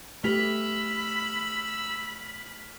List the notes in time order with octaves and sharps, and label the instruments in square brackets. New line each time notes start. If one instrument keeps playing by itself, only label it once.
[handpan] A3 G4 B4 [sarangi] B5 [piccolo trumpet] E6 [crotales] F6 B6 F7